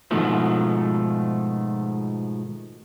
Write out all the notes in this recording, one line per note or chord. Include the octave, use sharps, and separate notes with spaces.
G#2 B2 D#3 F3 A3